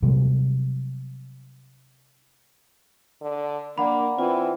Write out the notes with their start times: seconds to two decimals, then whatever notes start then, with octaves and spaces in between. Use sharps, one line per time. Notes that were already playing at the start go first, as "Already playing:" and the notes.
0.02 C3 F#3 G3 A3
3.21 D3
3.78 A#3 D4 D5 F#5 B5
4.18 E3 C4 F4